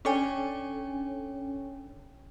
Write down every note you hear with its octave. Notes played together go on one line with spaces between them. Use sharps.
C#4 D4 A4 C#5 G5 G#5